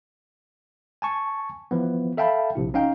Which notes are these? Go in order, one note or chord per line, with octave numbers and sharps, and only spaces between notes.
G#5 A5 C#6
E3 F3 B3
A4 E5 F5 G5 A5 B5
A#1 C3 E4
C#4 D#4 F5 G5